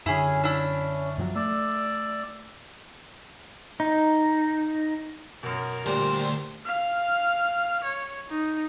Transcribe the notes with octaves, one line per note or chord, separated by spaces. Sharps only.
F#2 D3 C#4 E4 G#4
D4 E4
F#2 F3 F#3
A3 D5 E6
D#4
F#2 B2 A#4
D2 A#2 G3 C5
F5
C#5
D#4